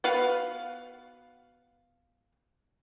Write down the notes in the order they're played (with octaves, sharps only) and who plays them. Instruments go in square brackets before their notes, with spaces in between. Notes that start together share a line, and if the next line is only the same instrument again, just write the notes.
[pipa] B3 F#4 B4 F5